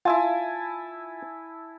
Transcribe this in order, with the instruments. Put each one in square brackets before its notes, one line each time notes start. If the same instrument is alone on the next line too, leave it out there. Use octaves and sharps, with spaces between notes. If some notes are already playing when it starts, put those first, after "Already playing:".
[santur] E4 G#5 A5 [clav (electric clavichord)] F4 E5